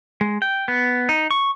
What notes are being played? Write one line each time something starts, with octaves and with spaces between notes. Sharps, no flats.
G#3
G5
B3
D#4
C#6